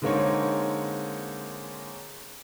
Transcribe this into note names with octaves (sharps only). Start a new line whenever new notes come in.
D3 G#3 A#3 C4 D#4 C#5